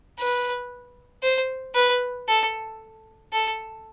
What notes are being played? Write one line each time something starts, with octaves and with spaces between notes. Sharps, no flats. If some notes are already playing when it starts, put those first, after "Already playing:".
B4
C5
B4
A4
A4